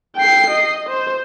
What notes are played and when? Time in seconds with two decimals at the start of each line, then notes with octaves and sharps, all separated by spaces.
0.16 G5 C7
0.50 D#5
0.89 C5